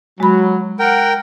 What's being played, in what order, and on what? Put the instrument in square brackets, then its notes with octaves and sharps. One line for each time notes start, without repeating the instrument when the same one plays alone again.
[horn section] F#3 [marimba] G#3 B5
[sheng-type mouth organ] A#4 G5 [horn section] F#5